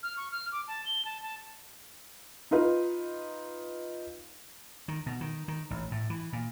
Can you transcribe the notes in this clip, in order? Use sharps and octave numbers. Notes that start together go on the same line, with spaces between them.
F6
C#6
F6
D6
A5
G7
A5
A5
D#4 F4 B4
D#3
B2
D#3
D#3
A1
A2
E3
A#2